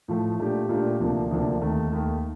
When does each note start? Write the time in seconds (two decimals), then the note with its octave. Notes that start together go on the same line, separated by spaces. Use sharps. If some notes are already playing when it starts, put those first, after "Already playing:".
0.08 A2 F3 A3
0.39 A#2 A3 D4 G4
0.69 A#2 A3 D4 G4
1.00 D2 C3 F3 A#3 D4
1.31 D2 C3 F3 A#3 D4
1.61 D#2 D#3 A3
1.92 D#2 D#3 A3